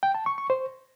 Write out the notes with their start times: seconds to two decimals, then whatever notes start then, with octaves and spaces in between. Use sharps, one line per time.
0.03 G5
0.15 A5
0.26 C#6
0.38 C#6
0.50 C5